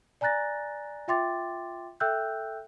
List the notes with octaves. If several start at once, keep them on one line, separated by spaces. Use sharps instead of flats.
D5 G#5 A#5 F#6 A6 A#6
F4 E5 G5 C6 D6 A6
A4 E5 G5 E6 F#6 G6